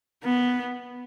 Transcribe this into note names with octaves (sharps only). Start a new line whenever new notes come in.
B3